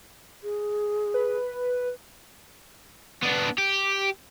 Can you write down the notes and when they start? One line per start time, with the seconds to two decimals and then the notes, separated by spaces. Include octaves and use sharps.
0.43 G#4
1.14 B4
3.22 B3 D4
3.58 G4